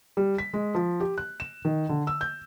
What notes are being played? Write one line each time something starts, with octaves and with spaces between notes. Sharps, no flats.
G3
B6
G#3
F3
G4
F#6
E7
D#3
D3
E6
G6